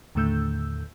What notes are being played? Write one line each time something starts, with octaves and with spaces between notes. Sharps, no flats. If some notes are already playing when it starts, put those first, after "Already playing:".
D#2 A2 D3 A3 E6 G6